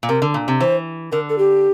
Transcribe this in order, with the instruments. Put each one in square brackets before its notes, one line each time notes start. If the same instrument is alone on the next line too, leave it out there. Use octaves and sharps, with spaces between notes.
[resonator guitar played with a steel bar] A#2
[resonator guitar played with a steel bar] C3 [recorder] A#4
[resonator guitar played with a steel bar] D3
A#2
C3
[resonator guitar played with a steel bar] E3 [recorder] C5
[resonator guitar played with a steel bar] D3 [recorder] A#4
[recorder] A4
G4